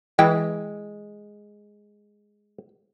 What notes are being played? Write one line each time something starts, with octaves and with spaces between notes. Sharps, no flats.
E3 G#3 G5